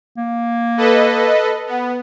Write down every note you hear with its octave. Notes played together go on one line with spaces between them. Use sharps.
A#3
A4 B4 D#5
B3